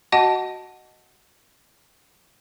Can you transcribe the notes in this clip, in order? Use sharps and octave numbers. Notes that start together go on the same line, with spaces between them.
F#4 D#5 F#5 A5